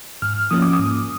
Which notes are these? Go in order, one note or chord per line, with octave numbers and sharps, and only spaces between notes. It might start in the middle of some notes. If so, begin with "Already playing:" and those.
G#2 F6
F3 A#3 C#4 D#6
D6
D#6
G#2